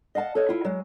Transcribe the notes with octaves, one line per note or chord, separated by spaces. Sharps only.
D#5 F5 F#5 A5
A4 C#5 D#5
E4 F4
F#3 G#3